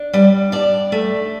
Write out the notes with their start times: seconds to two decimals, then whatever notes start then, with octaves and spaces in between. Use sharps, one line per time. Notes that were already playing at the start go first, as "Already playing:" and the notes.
Already playing: D4
0.13 G3 D5
0.52 D4 D5
0.92 A3